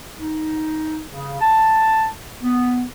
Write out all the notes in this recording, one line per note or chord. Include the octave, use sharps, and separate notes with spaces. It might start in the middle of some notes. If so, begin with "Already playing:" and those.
D#4
C#3
A5
B3